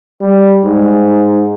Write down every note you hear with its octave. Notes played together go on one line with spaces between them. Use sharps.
G3
G#2